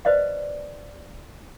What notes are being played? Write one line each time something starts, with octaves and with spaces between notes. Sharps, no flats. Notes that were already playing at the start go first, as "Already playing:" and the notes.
B4 C5 D5 D#5 F5